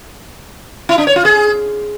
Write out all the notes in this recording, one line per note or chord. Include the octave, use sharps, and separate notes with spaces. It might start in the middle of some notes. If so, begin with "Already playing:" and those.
E4
D4
C#5
F4
G#4